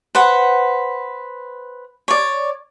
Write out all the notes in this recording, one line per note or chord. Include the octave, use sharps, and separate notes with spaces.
B4 C5 F#5
C#5 D5